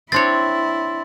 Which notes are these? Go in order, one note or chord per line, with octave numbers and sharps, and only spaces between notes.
C4 D4 E4 C#5 C6 A6